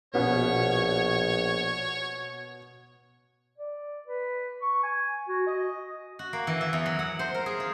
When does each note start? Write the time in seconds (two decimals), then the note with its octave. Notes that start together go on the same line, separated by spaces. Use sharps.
0.14 A#1 B2 B3 C#4 C#5
3.58 D5
4.08 B4
4.62 C#6
4.83 G#5
5.28 F#4
5.47 D#5
6.19 F#4
6.33 A#3
6.47 E3
6.61 E5
6.73 E2
6.86 F#3
6.99 F#5
7.19 C5
7.35 A#4
7.46 G#4
7.60 F4